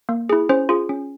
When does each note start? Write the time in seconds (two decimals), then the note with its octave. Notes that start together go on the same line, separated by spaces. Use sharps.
0.09 A#3
0.30 E4 G#4
0.49 C#4 C5
0.69 F4 G#4
0.89 C#4